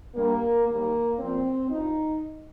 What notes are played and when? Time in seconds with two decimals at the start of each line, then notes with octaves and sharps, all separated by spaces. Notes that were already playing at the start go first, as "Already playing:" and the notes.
0.16 G2 G3 A#3
0.68 D#2 D#3 G3 A#3
1.19 A#2 F3 C4
1.71 G2 F3 D#4